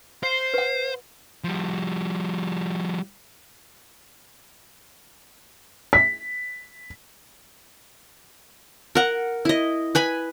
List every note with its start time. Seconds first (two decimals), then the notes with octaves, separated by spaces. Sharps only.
0.23 C5 F5
0.54 B4 F#5
1.44 F3 G3
5.93 B6
8.95 A#4 F#5
9.45 E4 D#5
9.95 B4 G#5 B5